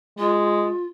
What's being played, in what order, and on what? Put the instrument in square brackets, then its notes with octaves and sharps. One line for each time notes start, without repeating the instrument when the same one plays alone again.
[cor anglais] G#3 [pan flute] F4